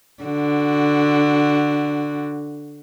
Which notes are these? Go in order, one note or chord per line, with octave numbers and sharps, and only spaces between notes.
D3 F#4